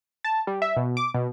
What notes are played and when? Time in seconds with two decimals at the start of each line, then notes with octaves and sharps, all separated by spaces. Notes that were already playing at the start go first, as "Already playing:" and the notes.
0.24 A5
0.47 G3
0.62 E5
0.77 B2
0.97 D6
1.14 B2